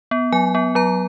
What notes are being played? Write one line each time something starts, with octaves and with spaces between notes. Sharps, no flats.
B3
F#3 G#5
B3
F#3 A#5